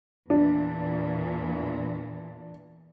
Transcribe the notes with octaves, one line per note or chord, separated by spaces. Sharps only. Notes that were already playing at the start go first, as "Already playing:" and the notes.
E2 A#2 E3 D4